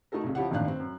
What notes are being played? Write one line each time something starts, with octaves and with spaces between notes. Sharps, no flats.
A3 D#4 F#4 A4 A#4
C2 C#3
F3 C#4 E4 G4 F#5
G1 D#2 A2 D4 F5 F#6
C4
F#2